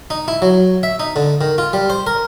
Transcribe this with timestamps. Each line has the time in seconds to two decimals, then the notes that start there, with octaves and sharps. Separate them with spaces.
0.10 D#4
0.28 E4
0.42 F#3
0.83 E5
1.00 D#4
1.16 D3
1.41 D#3
1.58 F4
1.73 G3
1.90 C5
2.07 A#4